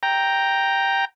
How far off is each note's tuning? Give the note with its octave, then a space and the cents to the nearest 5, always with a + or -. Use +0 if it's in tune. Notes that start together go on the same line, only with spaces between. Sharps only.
G5 +0 A#5 +0